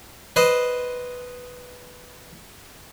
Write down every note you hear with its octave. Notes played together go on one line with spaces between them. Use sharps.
B4 C5 D#5